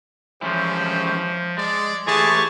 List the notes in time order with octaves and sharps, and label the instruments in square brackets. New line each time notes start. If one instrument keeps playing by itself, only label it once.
[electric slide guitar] E3 G#3 C#4 [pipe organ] F3 [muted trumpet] G4
[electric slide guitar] G#3 [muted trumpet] D5
[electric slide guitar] E3 A3 [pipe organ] G4 C#6 [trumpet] G#4 [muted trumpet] A5